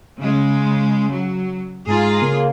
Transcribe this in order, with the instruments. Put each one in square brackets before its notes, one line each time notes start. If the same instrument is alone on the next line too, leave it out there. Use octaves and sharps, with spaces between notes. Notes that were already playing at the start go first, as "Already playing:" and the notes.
[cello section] C#3 G#3
F#3
[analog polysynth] G#2 A#5 A6 [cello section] F4 G#4
[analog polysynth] C#3 A#3